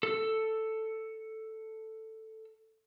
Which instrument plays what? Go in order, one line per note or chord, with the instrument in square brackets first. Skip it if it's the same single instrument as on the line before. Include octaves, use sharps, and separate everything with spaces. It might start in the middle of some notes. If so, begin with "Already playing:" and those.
[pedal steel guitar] A4 E6